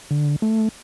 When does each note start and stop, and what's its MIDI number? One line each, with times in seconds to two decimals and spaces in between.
0.11 0.36 50
0.42 0.68 57